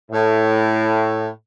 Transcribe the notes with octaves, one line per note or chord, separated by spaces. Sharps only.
A2